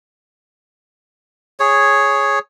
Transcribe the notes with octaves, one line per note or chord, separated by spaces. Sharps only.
G#4 C#5